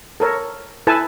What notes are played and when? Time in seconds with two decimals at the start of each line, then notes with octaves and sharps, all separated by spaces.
0.20 A4 A#4 C#5
0.87 E4 A4 B4 G#5 A5